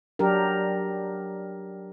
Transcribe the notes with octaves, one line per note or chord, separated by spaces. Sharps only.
F#3 D4 G4 A#4